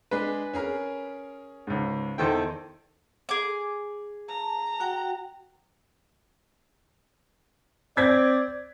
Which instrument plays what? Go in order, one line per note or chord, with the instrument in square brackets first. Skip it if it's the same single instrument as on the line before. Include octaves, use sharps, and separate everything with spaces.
[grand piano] G#3 D4 G#4 [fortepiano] B4
[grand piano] C#4 G#4 A#4
[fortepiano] C#2 G#2
[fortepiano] E2 D#3 G5 [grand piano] E4 A4 C5
[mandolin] G#4 D6
[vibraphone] A5 [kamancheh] A#5
[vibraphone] F#4 F#5 G5
[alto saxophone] C4 [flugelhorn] D5 [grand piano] G#6 B6